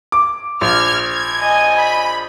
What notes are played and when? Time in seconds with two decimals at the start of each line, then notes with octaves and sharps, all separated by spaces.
0.12 D6
0.61 A#1 F6 G#6
1.03 G#6
1.40 D#5 G#5
1.78 B5